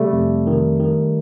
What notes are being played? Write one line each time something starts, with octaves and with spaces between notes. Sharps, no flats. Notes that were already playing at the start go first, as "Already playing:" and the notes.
Already playing: C3 G3 A3
F2
D#3
D#3